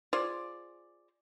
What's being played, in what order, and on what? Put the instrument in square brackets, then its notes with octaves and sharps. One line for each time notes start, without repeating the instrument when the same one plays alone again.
[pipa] F4 G#4 C5 D5